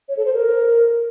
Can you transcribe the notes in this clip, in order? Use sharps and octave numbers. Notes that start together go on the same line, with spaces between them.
C#5
A4
C5
A#4